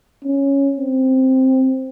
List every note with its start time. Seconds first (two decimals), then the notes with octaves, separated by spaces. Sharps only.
0.24 C#4
0.76 C4